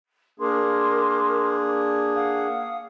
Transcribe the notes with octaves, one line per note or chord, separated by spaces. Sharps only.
A#3 D4 G#4 A#4 C6 D6
F5 F#5 D#6